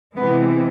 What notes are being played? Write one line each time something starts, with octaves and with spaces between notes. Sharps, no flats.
C3 E3 G#3 B3